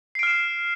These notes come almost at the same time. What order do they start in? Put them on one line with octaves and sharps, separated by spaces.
C7 D7 F6 E7